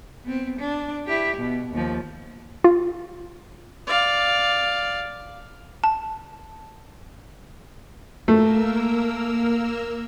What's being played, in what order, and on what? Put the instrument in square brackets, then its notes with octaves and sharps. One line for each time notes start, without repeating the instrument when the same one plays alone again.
[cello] B3 C4
D4
E4 G4
B2
D#2 F3
[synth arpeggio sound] F4
[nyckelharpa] D5 F5
[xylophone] A5
[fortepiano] A3 [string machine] A#3 A#4 E6